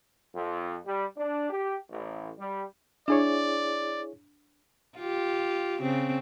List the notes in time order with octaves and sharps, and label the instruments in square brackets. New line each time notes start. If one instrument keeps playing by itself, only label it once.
[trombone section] F2
G3
D4
G4
A1
G3
[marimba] D4 [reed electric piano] E4 G#4 C#5 [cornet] D5
[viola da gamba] F4 G4
C#3 C4